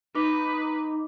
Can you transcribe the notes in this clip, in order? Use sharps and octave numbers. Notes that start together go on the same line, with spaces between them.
D#4 B4 D6